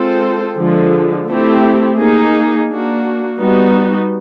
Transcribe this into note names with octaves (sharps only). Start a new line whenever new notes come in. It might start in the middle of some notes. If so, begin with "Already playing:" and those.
Already playing: G#3 C4 F4 A4 C5
D3 F3 G#3
A3 C4 E4 G4
A#3 D#4 G#4
A#3 D4 F#4
G3 B3 D#4 F#4